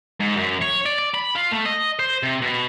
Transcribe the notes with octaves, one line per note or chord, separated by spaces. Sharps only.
G#2
F#2
C#5
D5
D5
B5
F4
A3
D#5
C5
C3
B2